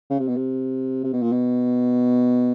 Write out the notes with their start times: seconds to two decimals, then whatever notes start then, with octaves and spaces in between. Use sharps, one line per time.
0.10 C#3
0.19 C3
0.28 B2
0.36 C3
1.04 C3
1.13 B2
1.22 A#2
1.32 B2